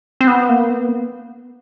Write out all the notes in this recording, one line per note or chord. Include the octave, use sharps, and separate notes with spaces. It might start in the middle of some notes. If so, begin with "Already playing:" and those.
C4
B3
A#3
B3